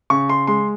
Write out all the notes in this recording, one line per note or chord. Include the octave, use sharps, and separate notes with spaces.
C#3 C#6
C6
G#3 C6